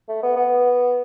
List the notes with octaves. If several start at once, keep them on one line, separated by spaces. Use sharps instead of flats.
A3
B3
B3